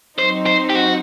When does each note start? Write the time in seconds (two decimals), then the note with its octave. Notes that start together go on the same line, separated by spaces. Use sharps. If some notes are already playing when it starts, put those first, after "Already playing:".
0.18 F#3 C4 D#4 C5
0.46 C5
0.70 G4
0.75 F#4